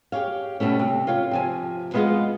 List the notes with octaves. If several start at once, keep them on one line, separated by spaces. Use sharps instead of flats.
G4 G#4 C#5 F5
B2 G3 A3 C#4
C3
F4 C#5 F5 G5
C3 F3 G#5
G#3 B3 F4 G#4 D#5 F#5